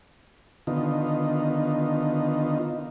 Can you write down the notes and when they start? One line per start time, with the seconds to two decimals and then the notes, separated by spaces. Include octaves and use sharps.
0.67 D3 D#3 B3 D#4 F4